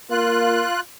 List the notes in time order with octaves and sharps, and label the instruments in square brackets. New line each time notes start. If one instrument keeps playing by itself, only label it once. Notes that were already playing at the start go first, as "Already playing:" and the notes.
[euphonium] A#3 [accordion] F4 F#6